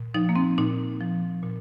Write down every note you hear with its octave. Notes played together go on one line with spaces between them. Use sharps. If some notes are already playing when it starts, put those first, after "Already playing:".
Already playing: A#2
F3 D#4
A#3
C4
A#2 D#4
F3
A#2